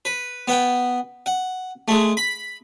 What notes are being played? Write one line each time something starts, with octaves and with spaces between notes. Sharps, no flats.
B4
B3 F#5 G5
F#5
G#3 A3
B5